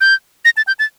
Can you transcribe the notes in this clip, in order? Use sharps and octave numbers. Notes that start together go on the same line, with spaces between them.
G6
A#6
A6
G6
A6